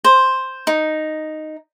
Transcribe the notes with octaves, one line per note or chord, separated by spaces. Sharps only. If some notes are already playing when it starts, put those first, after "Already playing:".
C5
D#4